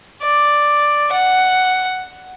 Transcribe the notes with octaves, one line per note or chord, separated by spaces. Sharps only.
D5
F#5